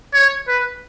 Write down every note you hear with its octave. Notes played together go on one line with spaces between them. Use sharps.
C#5
B4